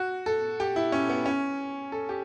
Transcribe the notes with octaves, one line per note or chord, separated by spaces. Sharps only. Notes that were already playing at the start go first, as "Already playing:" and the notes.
Already playing: F#4
A4
G4
E4
C#4
B3
C#4
A4
G4